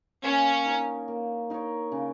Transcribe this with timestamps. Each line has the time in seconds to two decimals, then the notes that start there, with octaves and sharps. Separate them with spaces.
0.23 A#3 C#4
0.66 D#4 A#4 C#5
1.08 A#3
1.50 D#4 A#4 C#5
1.92 C#3